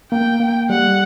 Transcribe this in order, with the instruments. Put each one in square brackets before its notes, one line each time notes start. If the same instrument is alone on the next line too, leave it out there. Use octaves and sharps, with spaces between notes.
[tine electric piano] A#3 [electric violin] G5
[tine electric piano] A#3
[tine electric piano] G3 [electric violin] F#5